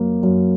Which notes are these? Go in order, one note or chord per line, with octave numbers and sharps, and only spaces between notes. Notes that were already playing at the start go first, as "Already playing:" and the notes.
Already playing: F#2 A#3
F#2